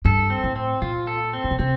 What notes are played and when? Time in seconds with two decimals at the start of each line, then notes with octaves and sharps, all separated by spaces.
0.05 G2 A4
0.30 C4
0.44 A2
0.56 C4
0.82 A#2 F4
1.07 A4
1.33 C4
1.44 A2
1.51 A#2
1.59 C3 C4